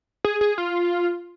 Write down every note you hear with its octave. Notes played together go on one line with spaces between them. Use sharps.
G#4
G#4
F4